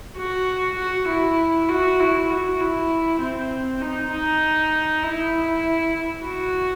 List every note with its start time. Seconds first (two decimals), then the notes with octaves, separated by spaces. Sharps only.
0.17 F#4
0.78 F#4
1.08 E4
1.69 F#4
2.00 E4
2.30 F#4
2.60 E4
3.20 C4
3.81 D#4
4.11 D#4
5.03 E4
6.24 F#4